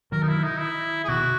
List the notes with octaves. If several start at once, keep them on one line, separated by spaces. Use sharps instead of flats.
D#3 F#3 A#4
D#4
E4
D#4
E4
G#4
B2 D#3 F#4